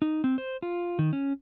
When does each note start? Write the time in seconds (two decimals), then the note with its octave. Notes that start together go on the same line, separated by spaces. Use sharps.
0.02 D#4
0.24 C4
0.38 C5
0.62 F4
0.99 D#3
1.13 C#4